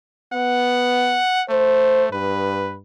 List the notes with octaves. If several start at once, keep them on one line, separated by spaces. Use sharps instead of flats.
B3 F#5
A3 C5
G2 B4